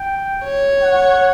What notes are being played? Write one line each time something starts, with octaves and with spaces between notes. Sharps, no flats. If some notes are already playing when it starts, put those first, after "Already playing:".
Already playing: G5
C#5
F#5